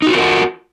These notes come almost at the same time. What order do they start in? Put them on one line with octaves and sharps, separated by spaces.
D#4 F#4 F4 A#4 F#5